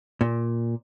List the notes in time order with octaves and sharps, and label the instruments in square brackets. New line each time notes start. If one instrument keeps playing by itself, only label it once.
[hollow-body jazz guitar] A#2